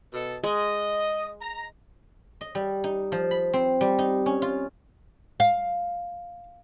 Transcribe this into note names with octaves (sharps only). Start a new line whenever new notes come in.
B2 A4
G#3 D#5
A#5
D#5
G3
D#4
F3
B5
C4
G3
D#4
C#4
F4
F5